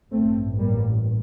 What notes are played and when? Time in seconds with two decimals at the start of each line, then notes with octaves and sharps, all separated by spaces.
0.12 A1 G2 A3 C4
0.58 G3 A#3